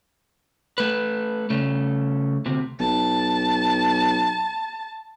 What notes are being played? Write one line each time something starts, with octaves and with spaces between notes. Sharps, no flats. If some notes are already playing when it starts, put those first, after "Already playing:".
A3 B4
C#3 A3
D2 C3
B1 A5